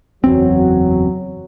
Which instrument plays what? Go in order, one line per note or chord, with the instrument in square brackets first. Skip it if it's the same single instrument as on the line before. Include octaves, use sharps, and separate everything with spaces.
[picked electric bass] F#1 E2 C4 [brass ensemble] F#3